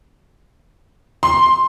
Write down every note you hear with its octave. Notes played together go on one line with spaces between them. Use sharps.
C6